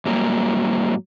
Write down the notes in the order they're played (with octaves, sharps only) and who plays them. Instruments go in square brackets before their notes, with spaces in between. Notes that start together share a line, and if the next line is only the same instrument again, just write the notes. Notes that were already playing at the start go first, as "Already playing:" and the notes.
[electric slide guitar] G#2 F#3 G3 A#3